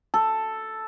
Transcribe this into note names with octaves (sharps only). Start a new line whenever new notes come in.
A4